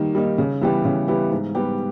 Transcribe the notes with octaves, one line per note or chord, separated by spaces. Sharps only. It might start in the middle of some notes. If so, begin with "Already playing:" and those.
Already playing: D#3 G3 A#3 D#4
G3 A#3 D#4
C#3
E3 G3 B3 G4
C#3
E3 G3 B3 G4
G#2
G3 B3 G4